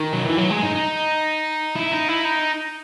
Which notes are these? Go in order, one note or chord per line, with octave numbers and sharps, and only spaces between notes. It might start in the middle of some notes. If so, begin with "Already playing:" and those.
Already playing: D#3
F#3
E3
F#3
G#3
D#4
D#4
E4
D#4
E4
D#4